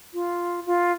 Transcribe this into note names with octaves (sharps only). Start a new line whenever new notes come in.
F4
F4